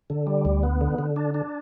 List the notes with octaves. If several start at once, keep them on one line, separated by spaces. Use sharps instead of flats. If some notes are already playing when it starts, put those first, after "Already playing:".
D3
G3
D2
B3
D3
D3
D4
D4